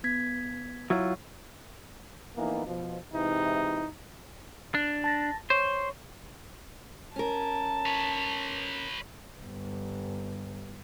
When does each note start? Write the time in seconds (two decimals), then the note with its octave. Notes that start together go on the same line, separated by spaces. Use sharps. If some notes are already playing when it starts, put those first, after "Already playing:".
0.04 B3 G#6 B6
0.90 F#3 E4 F4 C#5 C#6
2.36 F2 E3 A#3 B3 D#4
2.66 B2 F3
3.13 G#2 C3 E3 D#4 E4
4.75 D4
5.04 A5 A6 A#6
5.50 C5 C#5 C#6
7.16 C#4 A#4 A5
7.86 B4 C#5
9.40 G1